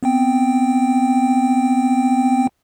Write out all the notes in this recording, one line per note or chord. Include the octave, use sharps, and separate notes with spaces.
B3 C4 G5